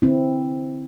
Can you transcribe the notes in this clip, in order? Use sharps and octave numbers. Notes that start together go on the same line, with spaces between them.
D3 C4 E4